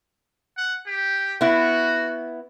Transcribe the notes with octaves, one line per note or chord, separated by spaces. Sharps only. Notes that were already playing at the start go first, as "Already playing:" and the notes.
F#5
G4
B3 E4 F#4